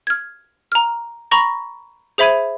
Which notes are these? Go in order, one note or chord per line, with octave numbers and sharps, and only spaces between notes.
F6 G#6
A#5 F6
A#5 B5 C#6 A#6
G#4 C5 E5 B5 G#6 D#7